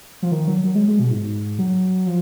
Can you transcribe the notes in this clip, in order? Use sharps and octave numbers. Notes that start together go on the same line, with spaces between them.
F3
D#3
F#3
F#3
G#3
G#3
B2
G#2
F#3
F3